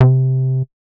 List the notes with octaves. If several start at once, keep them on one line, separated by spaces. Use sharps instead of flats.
C3